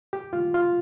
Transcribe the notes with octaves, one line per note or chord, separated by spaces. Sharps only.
G4
F4
F4